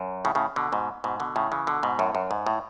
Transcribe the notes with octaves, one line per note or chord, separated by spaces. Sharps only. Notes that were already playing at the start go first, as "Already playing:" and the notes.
Already playing: F#2
A2 C#3
A2 C#3
B2 D3
G#2 B2
G#2 B2
B2 D3
A2 C#3
C#3 E3
B2 D3
G#2 B2
F#2 A2
F#2
G#2
A2